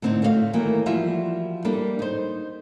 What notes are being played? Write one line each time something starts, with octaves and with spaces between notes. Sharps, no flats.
A2 D3 C4 D4 D#4
A3 F#4 C#5 F5
D#3 E3 F#3 A3 A#3
E3 F3 G3 F4 F#4 E5
G3 A#3 D4 A4
D#4 C5